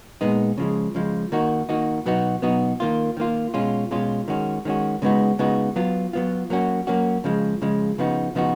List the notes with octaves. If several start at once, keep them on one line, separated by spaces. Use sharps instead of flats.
A#2 G#3 B3 D#4
C#3 F3 G#3
C#3 F3 G#3
D#3 A#3 D#4 F#4
D#3 A#3 D#4 F#4
B2 F#3 B3 D#4 F#4
B2 F#3 B3 D#4 F#4
D#3 A#3 F4
D#3 A#3 F4
B2 G#3 C#4 F4
B2 G#3 C#4 F4
D#3 G#3 C#4 F#4
D#3 G#3 C#4 F#4
C#3 G#3 B3 D#4 F#4
C#3 G#3 B3 D#4 F#4
F#3 B3 F4
F#3 B3 F4
F#3 A#3 C#4 F#4
F#3 A#3 C#4 F#4
C#3 F3 G#3
C#3 F3 G#3
C#3 F3 B3 D#4 F#4
C#3 F3 B3 D#4 F#4